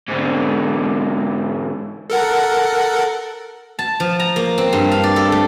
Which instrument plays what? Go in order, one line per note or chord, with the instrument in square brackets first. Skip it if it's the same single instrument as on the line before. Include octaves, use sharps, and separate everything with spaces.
[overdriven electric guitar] G#2 D3
[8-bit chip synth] A4 A#4 F#5
[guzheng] A5
F3
A#5
A#3
C4
G2
F5
D5
A4
A3